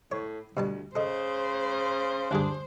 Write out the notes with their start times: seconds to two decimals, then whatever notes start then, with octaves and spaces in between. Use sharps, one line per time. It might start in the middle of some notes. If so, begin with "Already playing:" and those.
0.12 A2 C#5
0.57 D2 B2 G3 A5
0.96 C#3 A4 C5 D#5
2.31 D2 G2 D4 G#4